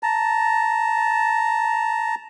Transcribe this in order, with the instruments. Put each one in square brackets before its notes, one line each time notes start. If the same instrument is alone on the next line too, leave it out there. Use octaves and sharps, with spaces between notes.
[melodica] A5 A#5